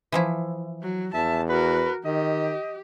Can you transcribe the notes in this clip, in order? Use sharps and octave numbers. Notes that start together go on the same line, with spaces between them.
E3 F3 E4
F#3
E2 E5 A5
F#4 A#4 B4
D#3 G4 D#5